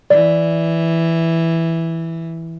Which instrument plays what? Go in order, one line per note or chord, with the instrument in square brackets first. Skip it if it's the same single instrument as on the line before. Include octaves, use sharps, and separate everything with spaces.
[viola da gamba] E3 [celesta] D5